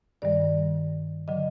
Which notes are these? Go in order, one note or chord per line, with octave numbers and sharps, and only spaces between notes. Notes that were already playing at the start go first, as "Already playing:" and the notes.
G2 D#3 G3 D5
D3 F#3 D#5